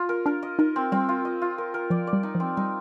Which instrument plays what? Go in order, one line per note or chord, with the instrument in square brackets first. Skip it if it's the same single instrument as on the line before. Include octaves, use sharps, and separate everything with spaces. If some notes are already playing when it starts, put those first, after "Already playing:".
Already playing: [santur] F4
A#4
[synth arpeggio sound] D4 [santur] A#4
[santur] D#5
[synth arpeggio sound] D#4 [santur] A#4
[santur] C4
[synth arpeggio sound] G3 [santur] C4
[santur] F4
D#5
F4
A#4
A#4
[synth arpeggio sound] F3 [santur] D5
[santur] D5
[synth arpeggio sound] G3
[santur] D#4
[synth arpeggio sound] F3
[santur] C4
[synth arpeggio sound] G3 [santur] D#4